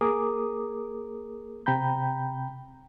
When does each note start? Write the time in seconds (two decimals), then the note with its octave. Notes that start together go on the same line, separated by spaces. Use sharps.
0.01 A#3 G#4 A#4 D6 D#6
1.66 C3 G5 A#5 B5 G6